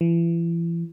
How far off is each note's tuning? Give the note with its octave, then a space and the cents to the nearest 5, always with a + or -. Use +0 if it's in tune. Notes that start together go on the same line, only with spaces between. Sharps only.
E3 +35